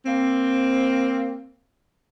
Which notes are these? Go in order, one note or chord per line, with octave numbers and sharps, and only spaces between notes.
A#3 C4